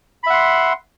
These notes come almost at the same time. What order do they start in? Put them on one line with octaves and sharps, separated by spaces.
B5 E5 F#5 C6